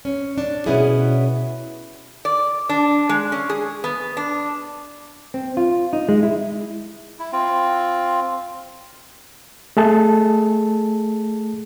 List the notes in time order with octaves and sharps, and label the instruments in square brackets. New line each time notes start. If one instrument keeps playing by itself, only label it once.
[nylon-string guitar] C#4
D4
B2 B3 C#4 E4 G#4
[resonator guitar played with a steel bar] D5
D4
G#3
C#4
G#4
B3
D4
[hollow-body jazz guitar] C4
F4
D#4
G#3
E4
[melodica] E4
C4 F4
[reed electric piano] A3 G#4 A5